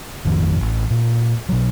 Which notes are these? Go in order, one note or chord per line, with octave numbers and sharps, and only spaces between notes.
A1 F2 D#3 F3
A1
A#2
B2 F#3